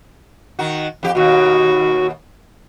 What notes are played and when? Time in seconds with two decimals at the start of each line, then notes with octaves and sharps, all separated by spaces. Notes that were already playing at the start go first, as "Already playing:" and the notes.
0.59 D#3 F#4
1.03 F2 G4
1.15 D#2 B2 F#4